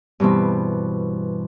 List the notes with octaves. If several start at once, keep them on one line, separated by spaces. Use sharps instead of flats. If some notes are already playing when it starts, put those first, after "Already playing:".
G2 B2 E3 C4